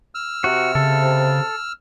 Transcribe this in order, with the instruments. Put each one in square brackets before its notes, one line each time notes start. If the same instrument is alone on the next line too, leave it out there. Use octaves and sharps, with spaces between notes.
[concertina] E6 F6
[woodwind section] C3 [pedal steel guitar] F#4
[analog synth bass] C#3 [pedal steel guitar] A4